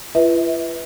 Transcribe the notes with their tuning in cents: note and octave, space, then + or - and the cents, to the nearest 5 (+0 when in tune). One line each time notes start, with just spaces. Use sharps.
F4 -45 B4 +0 E5 -25